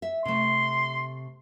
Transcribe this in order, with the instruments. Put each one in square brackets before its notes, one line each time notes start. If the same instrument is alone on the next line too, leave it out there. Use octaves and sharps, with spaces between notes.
[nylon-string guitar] E5
[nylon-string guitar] C3 A3 [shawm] C6